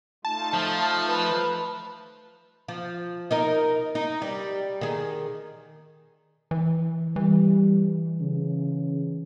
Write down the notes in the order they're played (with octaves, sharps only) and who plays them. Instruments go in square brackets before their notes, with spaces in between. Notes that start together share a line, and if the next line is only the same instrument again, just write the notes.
[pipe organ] A3 D#4 F4 [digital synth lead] A5
[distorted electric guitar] F3
[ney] B4
[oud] F3
D#4 A#4 D#5
D#4
G3
D#3 G#4
[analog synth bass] E3
[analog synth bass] E3 [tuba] G3
[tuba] C#3